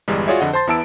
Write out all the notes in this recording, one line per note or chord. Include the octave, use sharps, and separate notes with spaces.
G1 E2 G3 G#3
F4 F#4 G#4 C#5 D5 E5
F2 D3 D#5 F#5
C5 A5 C6 A6
E2 B3 E4 A5 E6 D7